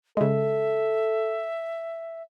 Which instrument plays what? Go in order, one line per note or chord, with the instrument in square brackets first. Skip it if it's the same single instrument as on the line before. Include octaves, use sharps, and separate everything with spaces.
[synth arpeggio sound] C#3 G#3 [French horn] A4 [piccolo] E5